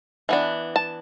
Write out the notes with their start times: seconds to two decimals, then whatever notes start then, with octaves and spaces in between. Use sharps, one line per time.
0.29 E3 B3 D4
0.76 A5